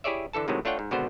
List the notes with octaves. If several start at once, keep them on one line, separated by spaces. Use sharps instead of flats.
E4 G4 G#4 C#5 D5 E5
D3 E3 A4 A5
A2 C3 D#3 F#3 G#3
A3 D4 F4 C#5 F#5 G5
G#2
G#1 B2 D3 B3 F#4 C5